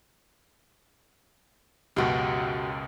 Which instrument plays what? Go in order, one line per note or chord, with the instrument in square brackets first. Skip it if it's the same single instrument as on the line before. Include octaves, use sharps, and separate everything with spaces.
[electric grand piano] C#2 F#2 B2 [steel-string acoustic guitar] F#4 G4